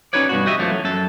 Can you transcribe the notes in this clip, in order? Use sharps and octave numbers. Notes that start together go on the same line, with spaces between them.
C#4 D#4 F#4 B4 C#5 D5
G2 B2 F#4
F#4 G4 D#5 E5
F#2 E3 F3 A3 A#3
F#3
F#2 A4